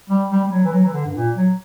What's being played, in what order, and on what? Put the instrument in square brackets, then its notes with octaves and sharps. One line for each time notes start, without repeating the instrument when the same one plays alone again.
[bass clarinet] G3
G3
G3
F#3
E3
F#3
E3
D3
G2
A#2
F#3